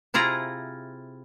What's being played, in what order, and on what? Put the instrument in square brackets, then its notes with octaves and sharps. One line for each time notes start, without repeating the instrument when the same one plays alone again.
[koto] C3 E4 F4 G#4 A#5